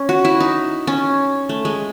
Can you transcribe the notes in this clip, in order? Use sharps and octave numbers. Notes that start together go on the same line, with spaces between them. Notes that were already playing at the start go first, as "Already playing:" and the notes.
Already playing: C#4
F#4
E4
D#4
C#4
A3
G#3